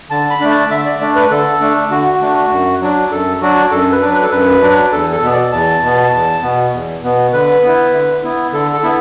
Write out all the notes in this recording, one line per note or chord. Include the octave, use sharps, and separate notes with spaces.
D3 A5
B5
A3 D4
A5
D3 E5
D5
A3 D4 D5
B4
D3 A4
A3 D4
D3 F#4
A3 D4
F#2
F#3 D4
F#2 A4
F#3 D4 F#4
F#2 A4
B4
F#3 D4
B4
A4
F#2 B4
F#3 D4
E2 A4
A4
B2 B3
D5
E2 A5
B2 B3
E2
B2 B3
E2
B2 B3
D3 B4
B3 E4
D3
B3 E4
D3 A4
A4
B3 E4